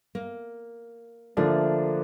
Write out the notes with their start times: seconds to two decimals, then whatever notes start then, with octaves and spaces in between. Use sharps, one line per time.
0.15 A#3
1.37 D3 F3 A3 A#3 D4